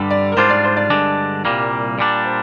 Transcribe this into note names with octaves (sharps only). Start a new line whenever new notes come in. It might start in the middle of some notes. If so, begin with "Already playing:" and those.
Already playing: G2 D3 G3
D5
A#4
G#2 G3 D4 F4 C5
D5
C5
D5
G2 D3 G#3 D4
C2 A#2 G3 A#3
A#2 G3 D4 D5
C5